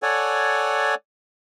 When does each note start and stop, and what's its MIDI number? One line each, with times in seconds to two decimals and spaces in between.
0.03 0.95 69
0.03 0.95 73
0.03 0.95 74
0.03 0.95 78
0.03 0.95 80